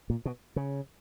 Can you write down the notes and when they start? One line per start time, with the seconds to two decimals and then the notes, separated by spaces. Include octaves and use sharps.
0.10 A#2
0.25 B2
0.56 C#3